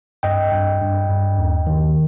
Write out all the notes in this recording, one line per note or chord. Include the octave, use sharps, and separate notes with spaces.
G2 D#5 G5
G2
G2
G2
D#2
D#3